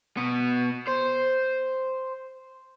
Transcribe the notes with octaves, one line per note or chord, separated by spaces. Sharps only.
B2 B3
C5